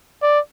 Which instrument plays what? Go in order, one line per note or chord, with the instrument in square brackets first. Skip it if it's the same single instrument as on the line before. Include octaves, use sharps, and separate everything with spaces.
[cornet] D5